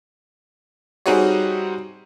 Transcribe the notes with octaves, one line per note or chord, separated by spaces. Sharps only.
G3 C4 D#4 F#4 G#4 C#5